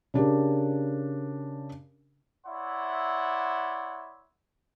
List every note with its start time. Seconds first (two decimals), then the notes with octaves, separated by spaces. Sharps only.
0.14 C#3 D4 G4 A#4
2.47 E4 C#5 D5 E5 F#5 C6